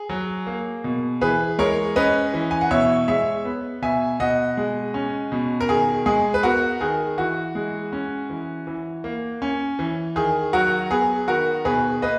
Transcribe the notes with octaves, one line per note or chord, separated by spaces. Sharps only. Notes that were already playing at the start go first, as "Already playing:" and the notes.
Already playing: G#4
F#3
A#3
B2
E3 G#4 B4
G#3 A#4 C#5
C#4 B4 D#5
E3
G#5
F#5
B2 C#5 E5
G#3 C#5 E5
B3
B2 E5 G#5
B2 D#5 F#5
G#3
C#4
B2
A#4
D#3 G#4
G#3 G#4
B4
B3 F#4 A#4
D#3 G#4
E3 F#4
G#3
C#4
E3
E3
A#3
C#4
E3
D#3 G#4
F#3 F#4 A#4
B3 G#4
D#3 F#4 A#4
B2 G#4 B4
A#3 B4 D#5